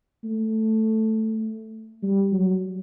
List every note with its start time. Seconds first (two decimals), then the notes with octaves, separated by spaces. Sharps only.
0.24 A3
2.02 G3
2.32 F#3